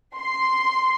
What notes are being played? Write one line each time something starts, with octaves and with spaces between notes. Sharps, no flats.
C6